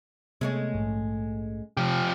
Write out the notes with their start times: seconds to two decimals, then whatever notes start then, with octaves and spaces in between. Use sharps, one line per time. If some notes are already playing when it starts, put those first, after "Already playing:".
0.41 C3 G#3 A3 B3 C#4
0.74 A#1 G#2
1.77 C3 F3 G4